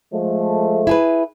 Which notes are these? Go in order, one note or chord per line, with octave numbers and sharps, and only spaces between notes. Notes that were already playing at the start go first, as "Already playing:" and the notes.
F3 G#3 A3
E4 G#4 B4